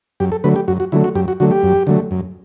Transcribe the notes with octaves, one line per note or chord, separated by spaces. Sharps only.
F#2 G4
A4
D3 F#3 A3 B4
G4
F#2 F#4
F#4
D3 F#3 A3 E4
F#4
F#2 G4
F#4
D3 F#3 A3 F#4
G4
F#2
D3 F#3 A3
F#2